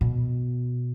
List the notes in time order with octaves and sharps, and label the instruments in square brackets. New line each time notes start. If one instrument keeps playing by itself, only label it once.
[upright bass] B2